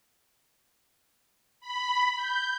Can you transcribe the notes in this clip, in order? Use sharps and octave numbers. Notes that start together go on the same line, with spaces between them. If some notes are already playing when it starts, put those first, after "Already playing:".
B5
G6